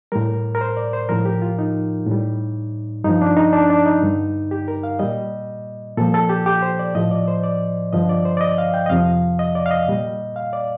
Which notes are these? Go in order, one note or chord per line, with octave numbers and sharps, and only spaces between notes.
A2 G3 A#4
A#4
C5
D5
C5
A2 F3 A#4
G4
F4
D#4
A2 G3
G2 D#4
F3
D4
D#4
D4
D4
D#4
G2 D3 G3
G4
A#4
F5
A#2 G3 D#5
A#2 F3 A4
A4
G4
G4
C5
D5
A2 F3 D#5
D5
C5
D5
G2 D3 F3 D#5
D5
C5
D5
D#5
F5
G5
D#5
F2 C3 F3 F5
D#5
D5
F5
D#5
A#2 G3
F5
D5